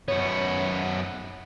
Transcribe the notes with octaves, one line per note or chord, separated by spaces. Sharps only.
F#2 B3 C#5